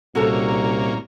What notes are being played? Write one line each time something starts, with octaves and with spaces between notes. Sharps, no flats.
C2 A#2 A#3 C#4 F#4 A4 A#5